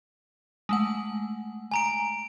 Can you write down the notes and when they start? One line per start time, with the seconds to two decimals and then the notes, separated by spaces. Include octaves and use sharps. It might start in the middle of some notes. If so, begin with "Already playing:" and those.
0.69 G#3 A3 F#5
1.71 G#5 A#5 D7